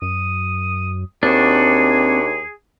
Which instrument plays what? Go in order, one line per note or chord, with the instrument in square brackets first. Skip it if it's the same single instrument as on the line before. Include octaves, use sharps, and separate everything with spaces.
[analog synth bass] F#2 [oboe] D#6
[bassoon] D#2 [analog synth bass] C4 [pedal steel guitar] D4 F#4 [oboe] G#4